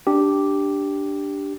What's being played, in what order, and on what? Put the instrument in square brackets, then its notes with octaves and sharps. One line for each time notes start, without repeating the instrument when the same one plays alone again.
[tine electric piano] D4 G4